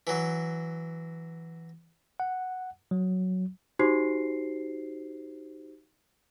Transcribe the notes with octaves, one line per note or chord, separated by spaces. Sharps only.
E3 F#3
F#5
F#3
D#4 F#4 G4 C5 C7